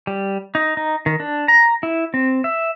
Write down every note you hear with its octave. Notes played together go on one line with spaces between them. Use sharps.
G3
D#4
D#4
D#3
D4
A#5
E4
C4
E5